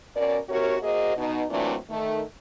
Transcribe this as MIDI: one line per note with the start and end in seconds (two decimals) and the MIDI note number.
0.16 0.38 47
0.16 0.38 61
0.16 0.38 70
0.16 0.38 74
0.49 0.76 39
0.49 0.76 48
0.49 0.76 66
0.49 0.76 67
0.49 0.76 70
0.49 0.76 73
0.82 1.14 58
0.82 1.14 66
0.82 1.14 68
0.82 1.14 72
0.82 1.14 75
1.17 1.43 47
1.17 1.43 63
1.49 1.75 46
1.49 1.75 52
1.49 1.75 54
1.49 1.75 57
1.49 1.75 60
1.49 1.75 62
1.90 2.22 51
1.90 2.22 57